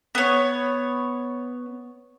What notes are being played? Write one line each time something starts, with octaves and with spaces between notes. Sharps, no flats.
B3 C#5